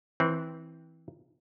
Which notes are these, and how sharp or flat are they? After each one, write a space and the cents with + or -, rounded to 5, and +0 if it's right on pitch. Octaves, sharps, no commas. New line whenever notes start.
E3 -15 C4 +0